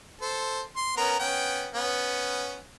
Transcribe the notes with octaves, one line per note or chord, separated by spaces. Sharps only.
A4 C5
C6
B3 C#4 A#4
B3 C#4 G5
B3 C#4